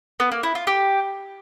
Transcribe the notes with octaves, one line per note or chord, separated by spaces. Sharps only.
B3
A#3
E4
F4
G4